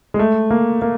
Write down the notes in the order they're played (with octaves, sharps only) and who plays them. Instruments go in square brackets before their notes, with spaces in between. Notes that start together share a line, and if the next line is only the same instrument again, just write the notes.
[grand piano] G#3
A3
A#3
A#3